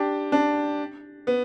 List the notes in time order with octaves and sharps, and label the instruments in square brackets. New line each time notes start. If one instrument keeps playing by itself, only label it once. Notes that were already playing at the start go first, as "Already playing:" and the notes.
Already playing: [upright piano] D4 G4
D4
B3